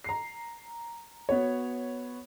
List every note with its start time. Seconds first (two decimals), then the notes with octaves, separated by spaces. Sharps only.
0.04 A#5 C7
1.29 B3 F#4 C#5